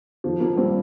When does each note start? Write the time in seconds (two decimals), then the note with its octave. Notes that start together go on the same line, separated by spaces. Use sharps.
0.24 F2 D#3 F3
0.40 F3 A#3
0.56 G3 C4